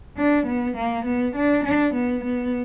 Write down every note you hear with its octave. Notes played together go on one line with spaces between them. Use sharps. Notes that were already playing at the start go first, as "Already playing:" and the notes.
D4
B3
A#3
B3
D4
D4
B3
B3